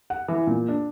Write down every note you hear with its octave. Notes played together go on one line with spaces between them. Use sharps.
F#5
E3
A#2
D4